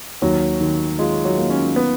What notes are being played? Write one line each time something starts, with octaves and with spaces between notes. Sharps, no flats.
D#2 F#3
D#3
G#3 F4
F#3
A#3
C#4
B3